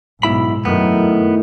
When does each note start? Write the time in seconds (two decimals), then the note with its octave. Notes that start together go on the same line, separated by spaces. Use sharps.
0.23 B1 G#2 B2 E4 B5
0.65 F#2 A2 D#3 B3